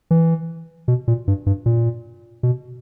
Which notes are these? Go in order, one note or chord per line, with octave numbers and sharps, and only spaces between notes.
E3
B2
A#2
G2
G2
A#2
B2